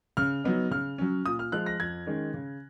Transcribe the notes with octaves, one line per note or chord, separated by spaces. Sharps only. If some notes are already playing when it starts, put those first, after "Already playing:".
C#3 F6
F#3 B3 D#4
C#3 F6
F#3 C#4
A#2 D#6
F6
F3 G#3 F#6
A#6
F2 G#6
D#3 G#3 C#4
C#3